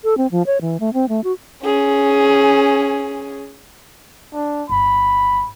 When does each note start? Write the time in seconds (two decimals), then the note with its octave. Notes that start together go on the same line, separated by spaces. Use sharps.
0.04 A4
0.17 C4
0.31 F3
0.47 C#5
0.61 E3
0.80 A3
0.93 C4
1.09 A3
1.24 F#4
1.64 C#4 G#4
4.33 D4
4.69 G1 B5